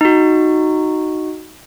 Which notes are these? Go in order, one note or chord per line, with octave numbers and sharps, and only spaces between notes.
D#4 F#4